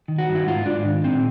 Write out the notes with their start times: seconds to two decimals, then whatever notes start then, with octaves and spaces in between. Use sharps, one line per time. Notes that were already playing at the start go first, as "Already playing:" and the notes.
0.08 D#3
0.18 F#4
0.29 G2
0.35 E4
0.47 G#2 F4
0.66 G#2 D4
0.85 D#3
1.04 A#2 C4